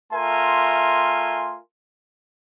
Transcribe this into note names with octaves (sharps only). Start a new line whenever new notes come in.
A3 F4 A#4 E5 G#5 C6